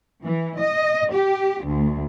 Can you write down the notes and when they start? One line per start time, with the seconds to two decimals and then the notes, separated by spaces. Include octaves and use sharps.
0.25 E3
0.60 D#5
1.13 G4
1.64 D2